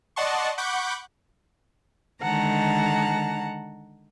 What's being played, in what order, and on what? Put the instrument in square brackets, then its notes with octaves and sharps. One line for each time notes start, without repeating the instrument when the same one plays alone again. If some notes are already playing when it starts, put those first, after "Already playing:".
[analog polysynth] D5 D#5 F#5 A5 C6 C#6
F#5 B5 C#6 D6 F#6 G6
[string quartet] D3 D#3 G#3 F#5 A5 A#5